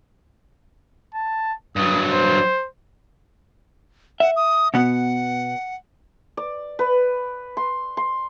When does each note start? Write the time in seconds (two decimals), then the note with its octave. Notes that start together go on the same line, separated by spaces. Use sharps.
1.14 A5
1.76 G2 F#3 D#6
2.10 C5
4.20 E5 F#5
4.36 D#6
4.74 B2 B3 F#5
6.37 D5
6.79 B4
7.57 C6
7.97 C6